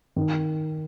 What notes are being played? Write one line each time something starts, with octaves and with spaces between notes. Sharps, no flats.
D#3